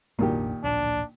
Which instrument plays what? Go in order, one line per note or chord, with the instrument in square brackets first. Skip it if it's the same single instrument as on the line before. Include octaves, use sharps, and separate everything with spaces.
[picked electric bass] F1 A#1 D4 [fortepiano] A#2 D#3 G4
[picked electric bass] D1 A#1 [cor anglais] D4